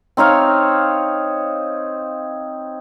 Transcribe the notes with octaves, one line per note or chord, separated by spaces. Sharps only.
C4 D#4 C#5 F5